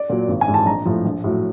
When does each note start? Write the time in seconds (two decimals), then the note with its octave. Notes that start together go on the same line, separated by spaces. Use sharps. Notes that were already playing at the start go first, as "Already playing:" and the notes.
Already playing: D5
0.10 A#2 F#3
0.28 G#1
0.41 G#5
0.48 G#2 E3
0.54 A5
0.66 A#1 A#5
0.85 A2 F3
1.05 A#1
1.24 A2 F#3